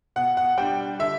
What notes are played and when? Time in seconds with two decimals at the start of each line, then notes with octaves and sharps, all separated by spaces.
0.16 B2 F#5
0.37 F#5
0.58 G3 D4 G5
0.99 D3 E5